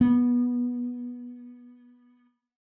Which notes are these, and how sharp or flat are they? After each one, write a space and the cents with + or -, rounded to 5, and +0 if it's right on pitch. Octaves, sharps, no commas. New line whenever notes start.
B3 -15